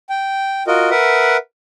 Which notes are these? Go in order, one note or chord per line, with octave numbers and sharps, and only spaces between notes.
G5
F4 F#4 A#4 D#5
A#4 B4 E5 F#5